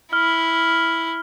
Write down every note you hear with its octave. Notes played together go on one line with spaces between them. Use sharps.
E4 F6